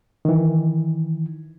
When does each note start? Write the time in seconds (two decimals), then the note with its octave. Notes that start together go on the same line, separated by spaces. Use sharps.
0.25 D#3 E3